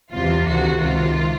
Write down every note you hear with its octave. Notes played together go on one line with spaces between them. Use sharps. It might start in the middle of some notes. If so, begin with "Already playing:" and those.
E2 C3 E3 F4
D2 C3 D#3 F#4
C#2 C3 D#3 F4